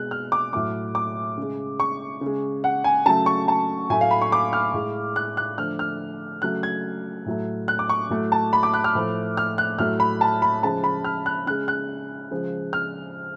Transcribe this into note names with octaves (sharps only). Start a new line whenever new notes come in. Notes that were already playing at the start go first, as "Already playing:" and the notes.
Already playing: B2 G#3 F#6
F6
D6
A2 F#3 A3 D6
D6
C#3 G#3
C#6
C#3
G#3
F#5
G#5
C#3 F#3 A3 A5
C#6
A5
A2 F#3 A3 G#5
F5
B5
C#6
D6
F6
A2 G#3
F#6
F#6
D3 F3 A3 F6
F6
C#3 F#3 A3 F#6
G#6
A2 F#3 A3
F#6
D6
C#6
A2 F#3 A3
A5
B5
D6
F#6
F6
A2 F3 A3
F6
F#6
A2 F#3 A3 F6
B5
A5
B5
C#3 F3 G#3 A5
B5
F6
F#6
C#3 G#3 F#6
F#6
C#3 F3 G#3
F6